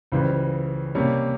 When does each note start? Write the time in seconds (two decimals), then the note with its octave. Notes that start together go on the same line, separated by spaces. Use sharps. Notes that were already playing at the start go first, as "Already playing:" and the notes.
0.12 C#2 C#3 E3 G3 C5
0.95 C3 G3 A#3 C#4